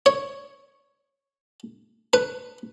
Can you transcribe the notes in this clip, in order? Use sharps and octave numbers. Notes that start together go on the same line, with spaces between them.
C#5
B4